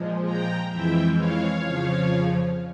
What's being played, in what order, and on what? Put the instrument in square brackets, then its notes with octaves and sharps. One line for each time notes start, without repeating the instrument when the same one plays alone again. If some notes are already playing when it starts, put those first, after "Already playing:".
Already playing: [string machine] A#2 F3 G#3
G5 A#5
F2 E3 G#3 E5 G5
C#5 F5
F2 C#3 F3